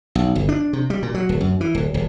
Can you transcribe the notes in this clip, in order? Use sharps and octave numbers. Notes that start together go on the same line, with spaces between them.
B1
G1
D4
C3
G3
A#2
F#3
D1
F#2
E3
D1
D#1